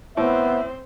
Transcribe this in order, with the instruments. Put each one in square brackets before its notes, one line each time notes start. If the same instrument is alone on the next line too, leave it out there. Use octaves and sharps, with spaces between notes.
[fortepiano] A2 [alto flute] B3 [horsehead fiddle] C4 C5 [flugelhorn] E5